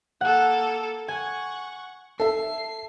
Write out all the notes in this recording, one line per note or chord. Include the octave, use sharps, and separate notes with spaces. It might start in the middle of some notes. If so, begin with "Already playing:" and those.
A#3 A4 F#5
F#5 G#5 C#6
A4 E5 C7